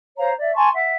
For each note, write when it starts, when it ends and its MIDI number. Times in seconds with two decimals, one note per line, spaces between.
0.17 0.30 72
0.17 0.30 73
0.17 0.30 77
0.17 0.30 82
0.39 0.52 74
0.39 0.52 76
0.55 0.69 80
0.55 0.69 81
0.55 0.69 84
0.55 0.69 85
0.73 0.96 76
0.73 0.96 78